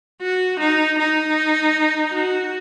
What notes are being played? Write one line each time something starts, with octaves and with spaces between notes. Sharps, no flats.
F#4
D#4
D#4
F#4